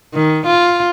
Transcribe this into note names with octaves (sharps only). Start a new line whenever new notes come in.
D#3
F4